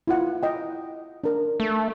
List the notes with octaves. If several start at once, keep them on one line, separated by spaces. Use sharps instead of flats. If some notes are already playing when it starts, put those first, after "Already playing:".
E4 F4 F#5
D#5 G5
D4 A#4
A3